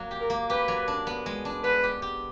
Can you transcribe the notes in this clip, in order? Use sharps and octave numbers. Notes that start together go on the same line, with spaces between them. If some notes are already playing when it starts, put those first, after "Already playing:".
Already playing: F#3 A#3
G4
A#4
A#3
G4 B4
F#3
D4
B3
G#3
D4
B3 B4
G4
G4